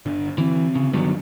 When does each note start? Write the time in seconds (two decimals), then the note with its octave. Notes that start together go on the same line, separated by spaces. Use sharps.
0.06 G1 D3
0.38 D3 E3 C4
0.75 C#3
0.93 G2 D3 D#3 F#3 B3